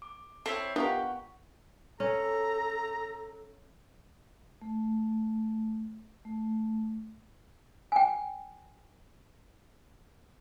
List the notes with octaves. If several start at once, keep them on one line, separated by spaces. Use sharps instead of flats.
D6
C4 E4 A4 C#5
B3 D4 F4 G4 A#4 F5 F#5 C#6
C#4 A4 A#5
A3
A3
G5 G#5